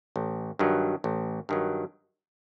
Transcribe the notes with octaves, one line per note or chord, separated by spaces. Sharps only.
A1
G2 D#3 F#3
A1
G2 D#3 F#3